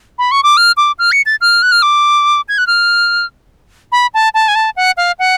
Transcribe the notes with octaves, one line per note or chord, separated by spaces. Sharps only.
B5
C#6
D6
F6
D6
F6
C#7
A6
F6
F#6
F6
D6
G#6
F#6
F6
B5
A5
A5
G#5
A5
F#5
F5
F#5